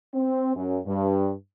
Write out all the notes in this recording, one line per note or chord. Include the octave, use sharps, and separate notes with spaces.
C4
F#2
G2